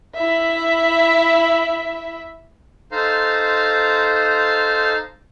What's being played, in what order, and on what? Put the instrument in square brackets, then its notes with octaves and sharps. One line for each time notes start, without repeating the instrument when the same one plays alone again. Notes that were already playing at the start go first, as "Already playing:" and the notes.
[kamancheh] E4 E5
[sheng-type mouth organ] D#4 A4 C5 F5 A#5 C6